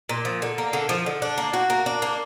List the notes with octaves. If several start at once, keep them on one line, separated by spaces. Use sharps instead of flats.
A#2
F3
D3
A#3
D3
F3
D3
D4
A#3
F#4
A#3
D4
A#3